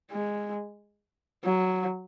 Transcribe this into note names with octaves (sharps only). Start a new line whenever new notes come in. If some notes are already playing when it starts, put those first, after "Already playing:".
G#3
F#3